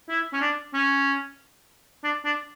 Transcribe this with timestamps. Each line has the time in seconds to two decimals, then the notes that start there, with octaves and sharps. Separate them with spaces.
0.09 E4
0.33 C#4
0.41 D4
0.74 C#4
2.04 D4
2.25 D4